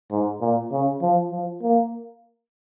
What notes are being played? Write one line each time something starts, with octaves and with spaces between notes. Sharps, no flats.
G#2
A#2
C#3
F3
F3
A#3